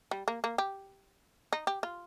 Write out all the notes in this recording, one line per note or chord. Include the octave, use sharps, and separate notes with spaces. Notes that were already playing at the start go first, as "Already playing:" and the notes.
G3
A#3
A#3
G4
D#4
G4
F4